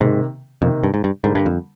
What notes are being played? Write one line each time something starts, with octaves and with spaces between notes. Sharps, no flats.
G#2 C3 D#3 A#3
F2 C3 D#3 A#3
G2
G#2
G2
G#2 D3 G3 A#3
G2
F2